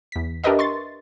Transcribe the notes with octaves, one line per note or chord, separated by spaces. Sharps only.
E2 B6
D4 G4 A#4 B4 D#5 E5
C6 C#6 A6